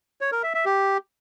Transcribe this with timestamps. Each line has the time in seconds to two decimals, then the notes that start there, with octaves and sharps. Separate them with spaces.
0.21 C#5
0.32 A#4
0.43 E5
0.54 E5
0.66 G4